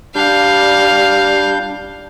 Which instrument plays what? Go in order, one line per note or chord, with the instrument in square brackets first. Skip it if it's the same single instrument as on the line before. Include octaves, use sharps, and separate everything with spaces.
[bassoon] G3 [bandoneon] D4 G6 [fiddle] F5